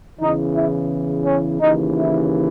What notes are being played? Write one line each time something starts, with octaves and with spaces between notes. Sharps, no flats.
E2 C#3 E3 D#4
E4
C#4
D#2 C#3 E3 D#4
E4